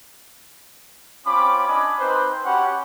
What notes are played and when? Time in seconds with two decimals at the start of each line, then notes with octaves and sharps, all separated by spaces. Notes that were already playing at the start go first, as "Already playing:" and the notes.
1.25 C4 C#4 F4 B5 D6
1.68 D4 D#5 G#5 B5 D6
1.99 C4 D#4 B4 C5
2.45 C#4 F#4 G4 F#5 G5 B5